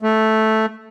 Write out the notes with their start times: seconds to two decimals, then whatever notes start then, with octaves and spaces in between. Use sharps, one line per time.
0.02 A3